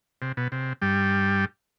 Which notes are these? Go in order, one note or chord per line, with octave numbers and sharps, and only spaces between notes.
C3
B2
C3
G2 G3